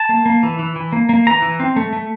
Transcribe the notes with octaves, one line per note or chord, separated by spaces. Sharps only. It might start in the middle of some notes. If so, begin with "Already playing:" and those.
Already playing: A5
A#3
A#3
E3
E3
E3
A#3
A#3
E3 A#5
E3
C4
A3
A3